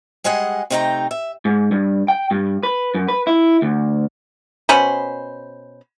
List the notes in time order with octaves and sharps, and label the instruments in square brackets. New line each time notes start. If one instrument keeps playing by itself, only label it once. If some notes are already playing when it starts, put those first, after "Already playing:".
[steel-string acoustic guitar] G3 G#3 G#4 D#5 F#5
C3 A3 D#4 F5 G5 A#5
E5
[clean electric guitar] G#2
G2
G5
G2
B4
F#2
B4
E4
D2
[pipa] B2 C#4 C5 B5